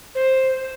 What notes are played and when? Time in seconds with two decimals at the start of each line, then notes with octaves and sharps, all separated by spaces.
0.15 C5